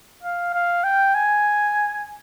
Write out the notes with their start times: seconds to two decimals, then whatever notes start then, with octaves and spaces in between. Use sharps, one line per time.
0.23 F5
0.54 F5
0.84 G5
1.15 G#5